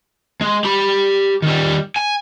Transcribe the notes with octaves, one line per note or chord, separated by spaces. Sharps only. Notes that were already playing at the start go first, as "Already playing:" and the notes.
G#3
G4 B5
D#3 G3
G#5